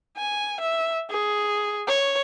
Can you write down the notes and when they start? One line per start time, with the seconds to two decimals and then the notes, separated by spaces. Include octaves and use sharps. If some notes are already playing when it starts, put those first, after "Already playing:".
0.17 G#5
0.60 E5
1.10 G#4
1.88 C#5